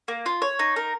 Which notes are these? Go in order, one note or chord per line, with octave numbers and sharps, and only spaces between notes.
A#3
F4
C#5
D#4
A#4